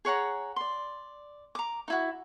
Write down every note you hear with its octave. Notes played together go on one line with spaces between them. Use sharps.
G#4 C#5 F#5 A#5
D5 C6
A#5 D6
D#4 E4 F#4